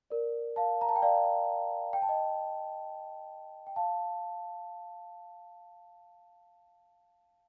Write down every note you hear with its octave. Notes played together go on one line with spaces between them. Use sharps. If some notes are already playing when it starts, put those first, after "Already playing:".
A#4 D5
F5 A5
A#5
A5
G5
D5 F5
G5
A5
D#5 G5
G5
F5 A5